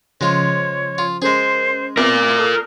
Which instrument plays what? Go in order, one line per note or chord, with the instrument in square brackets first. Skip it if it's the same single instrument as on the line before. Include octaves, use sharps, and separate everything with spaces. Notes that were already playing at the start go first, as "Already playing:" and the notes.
[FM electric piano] C#3 F3 C5 [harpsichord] G#3 F4 [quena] C#5
[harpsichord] F4
[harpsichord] G#3 G#4 [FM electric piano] C#4 A#4 [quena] C5
[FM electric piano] B3 C4 E5 [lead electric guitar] A#4 D5 [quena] D6
[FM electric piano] A4 D#6 C7